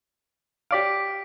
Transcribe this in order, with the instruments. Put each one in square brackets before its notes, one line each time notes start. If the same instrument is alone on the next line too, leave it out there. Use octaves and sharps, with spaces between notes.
[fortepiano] G4 D5 F5 [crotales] B6 D7